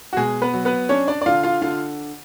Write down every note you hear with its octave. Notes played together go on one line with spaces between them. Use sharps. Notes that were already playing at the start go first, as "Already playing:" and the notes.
F#4
B2 G#3 G#4
B3 B4
F#3
B3 B4
C#4 D4 C#5
D4 D5
D5
D3 F4 F5
F4 F5
D3 F4 F5